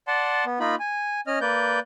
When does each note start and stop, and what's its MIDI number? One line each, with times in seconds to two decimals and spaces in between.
0.08 0.45 74
0.08 0.45 78
0.08 0.45 81
0.08 0.45 84
0.46 0.59 59
0.60 0.75 58
0.60 0.75 63
0.60 0.75 65
0.60 0.75 83
0.79 1.21 80
1.27 1.39 61
1.27 1.39 75
1.27 1.39 89
1.41 1.80 58
1.41 1.80 71
1.41 1.80 74
1.41 1.80 91